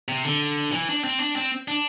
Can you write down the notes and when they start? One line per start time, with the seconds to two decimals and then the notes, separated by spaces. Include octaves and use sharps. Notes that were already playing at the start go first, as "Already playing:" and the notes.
0.08 C3
0.25 D3
0.72 E3
0.89 D4
1.04 C4
1.20 D4
1.36 C4
1.68 D4